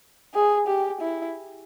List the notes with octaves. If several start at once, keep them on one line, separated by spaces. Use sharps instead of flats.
G#4
G4
E4